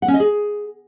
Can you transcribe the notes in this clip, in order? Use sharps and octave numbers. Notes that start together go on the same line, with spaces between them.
F#5
C#4
D#5
G#4